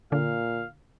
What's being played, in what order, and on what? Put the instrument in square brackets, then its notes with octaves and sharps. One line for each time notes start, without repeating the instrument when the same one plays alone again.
[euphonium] A#2 [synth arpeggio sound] D3 [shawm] F5